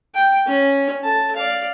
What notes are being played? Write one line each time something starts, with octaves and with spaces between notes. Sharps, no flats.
G5
C#4
A4 A5
D5 F5